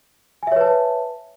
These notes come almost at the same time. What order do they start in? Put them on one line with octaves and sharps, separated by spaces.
G#5 E5 C#5 B4 A5